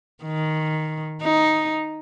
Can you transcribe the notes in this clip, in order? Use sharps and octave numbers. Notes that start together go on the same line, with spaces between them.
D#3
D#4